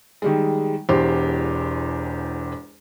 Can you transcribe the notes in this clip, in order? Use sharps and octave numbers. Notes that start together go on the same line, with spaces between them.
D#3 G3 G#3
E1 E2 G4 C5